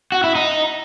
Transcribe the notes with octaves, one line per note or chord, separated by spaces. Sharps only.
F#4
E4
D#4